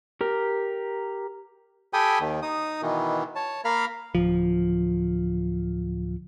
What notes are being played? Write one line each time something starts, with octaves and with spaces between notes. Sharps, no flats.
G4 A#4
G4 A4 G5 G#5 B5 D#6
D#2 D#3
D#4 D#6
B2 D#3 E3
C#5 A5
A#3 A#4 F5 B5 F6
D1 F3